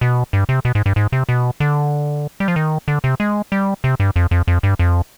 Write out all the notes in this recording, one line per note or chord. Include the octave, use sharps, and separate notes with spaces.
B2
G2
C3
B2
G#2
G2
G#2
C3
B2
D3
G3
F3
D#3
D3
C3
G#3
G3
C3
G2
F2
F2
F2
G2
F2